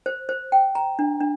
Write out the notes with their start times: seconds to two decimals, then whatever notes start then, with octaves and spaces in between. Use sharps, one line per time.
0.06 C5
0.29 C5
0.52 G5
0.75 A#5
0.99 D4
1.21 D4